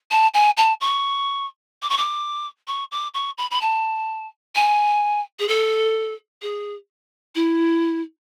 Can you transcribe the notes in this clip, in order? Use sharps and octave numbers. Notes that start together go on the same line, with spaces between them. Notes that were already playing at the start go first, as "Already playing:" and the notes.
A5
G#5
A5
C#6
D6
C#6
D6
C#6
D6
C#6
B5
B5
A5
G#5
G#4
A4
G#4
E4